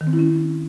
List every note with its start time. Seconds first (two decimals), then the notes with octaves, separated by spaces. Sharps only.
0.01 D#3
0.07 C4
0.13 E4
0.19 C#4